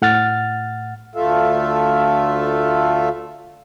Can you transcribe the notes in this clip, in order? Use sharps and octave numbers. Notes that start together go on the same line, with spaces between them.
A2 F#5 F6 A6
D2 A3 F4 A4 E5 F5